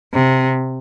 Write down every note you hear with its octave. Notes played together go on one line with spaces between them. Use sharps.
C3